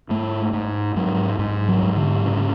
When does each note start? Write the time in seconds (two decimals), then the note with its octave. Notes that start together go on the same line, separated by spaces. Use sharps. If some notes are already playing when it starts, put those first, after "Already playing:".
0.10 G#2 A3
0.53 G#2
0.96 G#2 F#3
1.39 G#2
1.68 F#3
1.83 G#2
1.96 D3
2.26 C#3